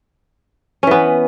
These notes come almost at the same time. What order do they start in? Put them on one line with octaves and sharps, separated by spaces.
C#4 E3 B3